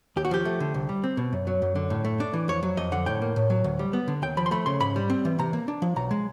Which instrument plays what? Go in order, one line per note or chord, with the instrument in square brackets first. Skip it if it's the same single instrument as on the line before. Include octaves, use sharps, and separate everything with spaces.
[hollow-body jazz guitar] D#2 G4
F#4
F3 G4
A3
D3
C2
G3
C4
B2
F#2
F#3
F#2
D3
A2
A3
D4
E3
F2 C#5
F#3
F2 D#5
D3 F#5
A2 G5
A#3
A2
F#3
D2
G3
B3
D3
D#2 G5
F3 B5
C6
A3 B5
C#3 C6
G#2 B5
G3
C4
E3
C3 A#5
A#3
D4
F3
B1 A#5
G#3